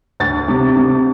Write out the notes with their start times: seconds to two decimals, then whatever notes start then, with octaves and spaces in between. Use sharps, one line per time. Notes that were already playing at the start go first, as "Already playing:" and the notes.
0.20 D2 A6
0.48 C3
0.76 C3